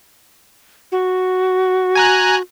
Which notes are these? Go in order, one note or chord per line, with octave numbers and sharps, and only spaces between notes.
F#4
G#5 A#5 F#6